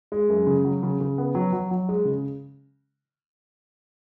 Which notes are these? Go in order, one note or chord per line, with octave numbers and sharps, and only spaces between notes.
G#3
F#2
C#3
F#3
C#3
C#3
B3
F#3
F#3
F#3
G#3
C#3